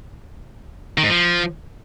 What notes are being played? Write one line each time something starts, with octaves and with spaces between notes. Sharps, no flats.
D#3
G#2
F3